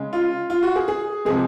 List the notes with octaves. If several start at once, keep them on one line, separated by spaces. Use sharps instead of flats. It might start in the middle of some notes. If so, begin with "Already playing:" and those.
Already playing: C#3 G#3
F4
F4
F#4
G#4
G#4
C3 F3 G#3 G#4